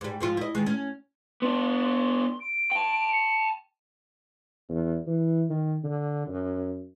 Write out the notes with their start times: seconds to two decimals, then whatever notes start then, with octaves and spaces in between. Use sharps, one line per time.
0.01 G#2 G3
0.21 G#2 F3 F4
0.37 E4 D#5
0.55 D#3 G#3
0.66 C#4
1.42 B3 D4 C6
1.83 C6
2.41 D7
2.72 G5 A5
3.13 C#7
4.69 E2
5.07 E3
5.50 D#3
5.84 D3
6.27 F#2